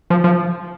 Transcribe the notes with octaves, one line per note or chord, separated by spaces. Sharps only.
F3
F3